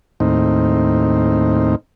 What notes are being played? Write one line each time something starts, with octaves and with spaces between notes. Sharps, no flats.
D#2 A2 C4 D#4